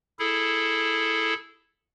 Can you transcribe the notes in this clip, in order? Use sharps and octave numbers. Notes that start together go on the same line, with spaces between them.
E4 G#4 A4